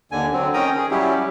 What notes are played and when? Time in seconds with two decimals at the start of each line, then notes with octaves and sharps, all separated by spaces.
0.12 D#2 D3 G#5
0.33 D3 F#3 C4
0.54 D#3 C#4 G5 A#5 D#6
0.77 G#4
0.91 F#3 G3 C#4 E4 G4